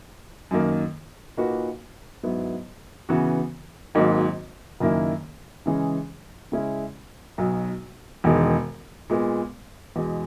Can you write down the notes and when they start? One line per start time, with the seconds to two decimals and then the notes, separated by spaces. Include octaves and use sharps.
0.51 F#2 D#3 A#3
1.37 A#2 A#3 D#4 F#4 B4
2.23 G#2 F#3 B3 E4
3.09 C#3 E3 B3 F#4
3.95 G#1 G#2 F#3 A#3 D#4
4.80 F#1 F#2 D#3 A#3 E4
5.66 C#3 E3 G#3 C#4 G#4
6.52 C#3 G#3 C#4 E4
7.38 B1 B2 F#3
8.24 E1 E2 D#3 G#3
9.10 A#2 G#3 B3
9.96 E2 B2 G#3